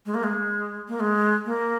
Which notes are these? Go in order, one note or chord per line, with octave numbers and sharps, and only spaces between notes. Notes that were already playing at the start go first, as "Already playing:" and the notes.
G#3
A#3
G#3
A#3
G#3
A#3